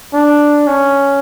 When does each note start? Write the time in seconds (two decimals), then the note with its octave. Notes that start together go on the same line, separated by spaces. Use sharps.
0.13 D4
0.67 C#4